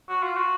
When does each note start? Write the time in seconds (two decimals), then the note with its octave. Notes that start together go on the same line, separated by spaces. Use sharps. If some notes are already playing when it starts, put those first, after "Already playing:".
0.09 F#4
0.23 F4
0.37 F#4